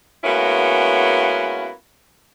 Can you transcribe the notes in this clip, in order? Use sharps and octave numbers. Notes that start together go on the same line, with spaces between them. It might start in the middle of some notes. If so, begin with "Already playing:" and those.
G#3 A#3 B3 C#4 E4 F#4